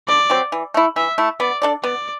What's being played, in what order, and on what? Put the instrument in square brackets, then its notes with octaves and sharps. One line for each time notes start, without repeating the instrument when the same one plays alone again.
[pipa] D3 [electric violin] D5
[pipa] F#3 C4 G4
E3
A3 E4
[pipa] E3 [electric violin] E5
[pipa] A3 E4
[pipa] B3 [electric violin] D5
[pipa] D4 A4 D5
[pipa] B3 [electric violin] D5